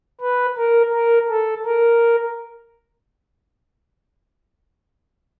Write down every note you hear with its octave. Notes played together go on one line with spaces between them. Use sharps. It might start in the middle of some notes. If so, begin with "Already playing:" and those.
B4
A#4
A#4
A4
A#4